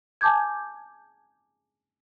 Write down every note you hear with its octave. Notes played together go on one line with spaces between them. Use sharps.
G#5 A5 D6 G6 G#6